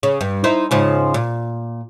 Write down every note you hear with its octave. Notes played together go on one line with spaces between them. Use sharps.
C#3
G2
D#4 E4 C5
G#2 C#3 F3
A#2